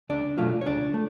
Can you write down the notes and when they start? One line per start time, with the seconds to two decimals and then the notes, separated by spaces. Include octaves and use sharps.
0.09 C#2 D4 D5
0.38 B2 F#3 A3 F4 F5
0.61 C#5
0.66 C#2 D4 D5
0.94 A3